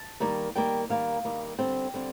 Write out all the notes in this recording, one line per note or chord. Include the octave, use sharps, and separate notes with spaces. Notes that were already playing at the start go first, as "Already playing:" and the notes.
Already playing: A5
D#3 G3 A#3
D#3 G3 A#3 G5
D#3 G3 A#3 F5
D#3 G3 A#3
D3 G3 C4 G5
D3 G3 C4